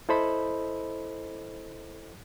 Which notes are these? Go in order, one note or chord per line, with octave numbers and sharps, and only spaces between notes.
E4 A4 C5 D#5 B5